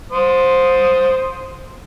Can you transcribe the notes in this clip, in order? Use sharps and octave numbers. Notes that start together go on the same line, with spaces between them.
C5 D#6